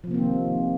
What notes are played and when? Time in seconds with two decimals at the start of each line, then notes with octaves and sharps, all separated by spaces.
0.04 F3
0.07 C3
0.11 A#3
0.14 C4
0.18 D#3